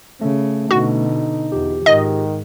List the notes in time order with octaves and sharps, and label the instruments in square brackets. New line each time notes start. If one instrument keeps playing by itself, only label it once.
[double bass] C#3 [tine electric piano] A3 C#4
[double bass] B2 D3 [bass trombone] D#4 [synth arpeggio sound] F#4
[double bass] E2 [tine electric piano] F4 G4
[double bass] G#2 [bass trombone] D#3 [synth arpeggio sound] D#5